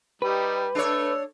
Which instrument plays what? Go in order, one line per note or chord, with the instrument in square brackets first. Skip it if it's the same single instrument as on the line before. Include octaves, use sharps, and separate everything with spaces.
[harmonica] G3 D#4 [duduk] G4 [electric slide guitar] B4
[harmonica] A3 [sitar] D4 C#5 [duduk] A4